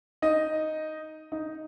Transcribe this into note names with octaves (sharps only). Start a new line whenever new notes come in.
D#4 D#5
D#4